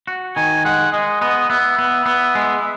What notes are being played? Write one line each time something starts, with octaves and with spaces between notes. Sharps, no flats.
F#4
D#3 G#5
G#3 F#5
G#3 D#5
B3 D#5
B3 E5
B3
B3
G#3